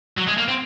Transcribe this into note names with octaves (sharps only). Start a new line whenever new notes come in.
F#3
G#3
A#3
C4